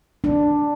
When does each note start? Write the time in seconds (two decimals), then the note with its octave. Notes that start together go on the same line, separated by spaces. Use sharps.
0.24 D4